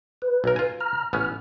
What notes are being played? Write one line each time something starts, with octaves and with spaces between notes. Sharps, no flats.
B4
B1 A#4
F4 G#5
A#5 F6
A1 B3 C#4 F6